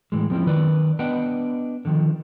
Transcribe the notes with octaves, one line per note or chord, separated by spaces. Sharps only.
A2 E3 G#3
F3 C4 C#4 E4
D#3 B4 D5
B3 D4 B4 D#5 F#5 G5
D3 D#3 F3